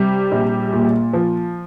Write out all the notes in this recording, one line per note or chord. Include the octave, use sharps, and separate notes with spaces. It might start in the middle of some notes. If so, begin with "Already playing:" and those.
Already playing: C3 G3
A#1
A#2
F3